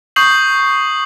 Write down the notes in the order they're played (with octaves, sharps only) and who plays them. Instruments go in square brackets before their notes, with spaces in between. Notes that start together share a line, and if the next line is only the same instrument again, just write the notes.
[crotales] C#6 D#6 G6 C7 F#7